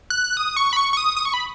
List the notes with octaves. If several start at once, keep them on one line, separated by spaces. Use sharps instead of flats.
F#6
D#6
C#6
B5
C#6
C#6
D#6
D#6
C#6
B5